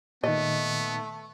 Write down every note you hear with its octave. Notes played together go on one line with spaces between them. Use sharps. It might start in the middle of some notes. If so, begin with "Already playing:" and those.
A#2 D#3 A3 B3 D#5